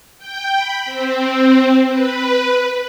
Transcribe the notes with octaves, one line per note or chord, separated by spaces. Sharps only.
G5
B5
C4
B4